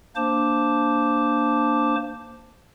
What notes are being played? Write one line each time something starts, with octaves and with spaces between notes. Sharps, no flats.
A#3 D4 C5 A5 D6